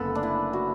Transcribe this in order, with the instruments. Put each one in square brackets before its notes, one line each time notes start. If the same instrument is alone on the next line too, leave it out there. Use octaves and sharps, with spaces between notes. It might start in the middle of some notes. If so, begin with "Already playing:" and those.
Already playing: [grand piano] F#1 F#2 D3 [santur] B3 A4 B4
[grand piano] A3
[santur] D4
E4
F#4